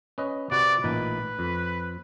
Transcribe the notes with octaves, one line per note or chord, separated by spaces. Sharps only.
C#4 B4 D#5
C3 F#4 B4 D5
A1 A#2 D#4 B4
F2